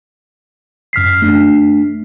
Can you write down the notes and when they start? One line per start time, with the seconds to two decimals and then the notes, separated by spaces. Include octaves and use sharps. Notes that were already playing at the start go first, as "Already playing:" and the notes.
0.93 F#2 F6 B6 C7
1.22 A3 D4